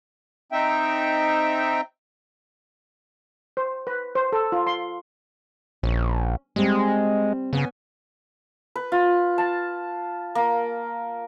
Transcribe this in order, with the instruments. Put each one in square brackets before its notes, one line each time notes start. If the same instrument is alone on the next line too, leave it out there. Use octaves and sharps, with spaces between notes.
[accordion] C4 D#4 E5 G5
[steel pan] C5
B4
C5
A4
F4
C6
[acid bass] A#1 [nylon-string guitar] C#4
[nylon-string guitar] G3 C4 [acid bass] G#3
[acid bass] C#3 [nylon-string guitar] B3 C#4 G#5
[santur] B4
F4
A5
A#3